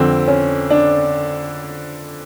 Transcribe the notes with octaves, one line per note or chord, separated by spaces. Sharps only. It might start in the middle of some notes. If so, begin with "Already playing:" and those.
Already playing: F2 D3 C4
C#4
D4